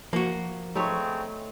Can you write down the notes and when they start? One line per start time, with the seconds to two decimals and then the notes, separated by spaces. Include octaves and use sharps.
0.13 F3 A#3 F#4
0.76 C#3 G#3 A3 C4 D#4 C#5